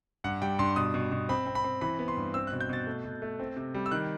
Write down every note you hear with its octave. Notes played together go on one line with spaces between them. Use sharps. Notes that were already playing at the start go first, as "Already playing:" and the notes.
G2 F#5
G3 G5
G2 C6
B2 D#6
B2
B2
C4 B5
C4
B5
C4
E3 B5
B3
C6
G2
C4 E6
B2 F#6
G6
B2 A6
A3
B2
A3
C4
C3
G3
E6
D#3 F#6